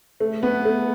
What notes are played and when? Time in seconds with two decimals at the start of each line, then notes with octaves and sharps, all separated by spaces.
0.20 A3
0.43 B3
0.65 A3